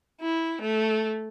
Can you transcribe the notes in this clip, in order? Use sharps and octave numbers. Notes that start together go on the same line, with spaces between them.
E4
A3